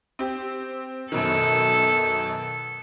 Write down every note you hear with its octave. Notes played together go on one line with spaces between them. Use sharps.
C4 G4
F#2 B2 D#3 A4